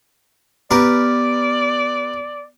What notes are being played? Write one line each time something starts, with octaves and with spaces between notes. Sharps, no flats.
B3 G4 A#4 B4 D5